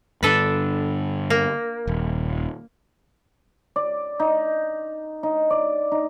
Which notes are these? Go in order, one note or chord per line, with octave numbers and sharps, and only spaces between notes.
G2 D3 D4 A4 B4
A#3
D#1
D5
D#4
D#4
D5
D#4